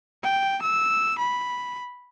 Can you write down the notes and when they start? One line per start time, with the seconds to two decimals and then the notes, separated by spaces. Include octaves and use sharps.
0.24 G5
0.63 E6
1.19 B5